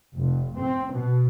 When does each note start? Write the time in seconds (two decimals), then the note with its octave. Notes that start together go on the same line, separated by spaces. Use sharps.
0.16 F1
0.59 C4
0.93 B2